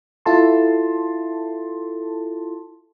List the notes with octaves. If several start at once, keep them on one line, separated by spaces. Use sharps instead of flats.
E4 F4 A4 A5 C6